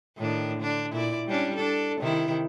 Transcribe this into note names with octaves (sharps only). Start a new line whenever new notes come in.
A2 D#3 D4
D3 D4
A#2 E4 D5
G3 C#4 D4
D4 A4
C3 D#3 E4